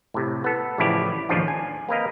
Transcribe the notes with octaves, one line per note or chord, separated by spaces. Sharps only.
A2 C3
B3 A4
A1 C#3 F3 E4 G4 D5
A1 D#2 C#3 F3 D4 F4
G#5
A#3 C4 A#4 B4 D#5 F5